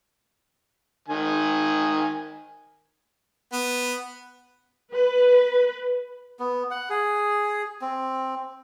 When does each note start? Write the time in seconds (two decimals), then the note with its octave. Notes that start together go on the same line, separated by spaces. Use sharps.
1.08 D#3 G#5
3.53 B3
4.93 B4
6.39 B3
6.71 F#5
6.90 G#4
7.82 C4